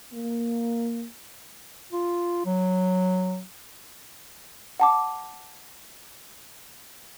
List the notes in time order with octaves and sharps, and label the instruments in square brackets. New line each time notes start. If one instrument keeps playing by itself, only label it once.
[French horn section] A#3
[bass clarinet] F4
F#3
[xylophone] F#5 A5 D6